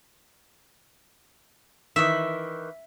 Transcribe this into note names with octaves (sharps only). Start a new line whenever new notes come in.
D#3 E3 E5